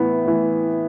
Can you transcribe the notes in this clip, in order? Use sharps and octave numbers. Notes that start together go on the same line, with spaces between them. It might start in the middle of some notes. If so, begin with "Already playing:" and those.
Already playing: A2 E3 B3
A2 E3